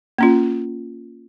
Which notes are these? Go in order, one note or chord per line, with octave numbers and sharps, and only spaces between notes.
A#3 C#4 F4